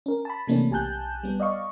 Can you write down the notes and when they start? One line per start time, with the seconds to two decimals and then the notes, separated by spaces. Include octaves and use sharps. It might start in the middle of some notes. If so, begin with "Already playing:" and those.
0.06 C#4 A#4
0.25 A5 B5
0.47 C3 E3 A3 A#3 C#4 D4
0.70 B1 G4 G#5 A5 F#6 G6
1.23 G3 B3
1.40 D5 D#5 F5 C#6